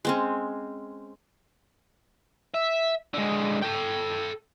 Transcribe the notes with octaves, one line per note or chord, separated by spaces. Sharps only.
G#3 C4 C#4
E5
D3 G#3
A4 G5